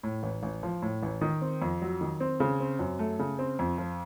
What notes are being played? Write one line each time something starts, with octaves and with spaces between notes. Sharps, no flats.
A2
A1
A1
F3
A2
A1
D#3
C4
F2
F#3
D#3
C4
C#3
C4
F#2
A3
C#3
C4
F2
F3